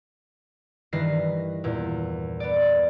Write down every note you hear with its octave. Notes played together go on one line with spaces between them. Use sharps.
G2 D#3 E3 B4 A#6 C7
E2 A#2
B3 D5